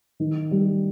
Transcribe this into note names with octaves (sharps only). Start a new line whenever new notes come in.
D#3
G3